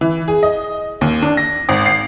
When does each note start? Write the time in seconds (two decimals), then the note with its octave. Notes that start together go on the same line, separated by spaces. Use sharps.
0.01 E3
0.28 G#4
0.43 D#5
1.01 D#2
1.22 D4
1.37 A#6
1.69 G#1
1.86 C7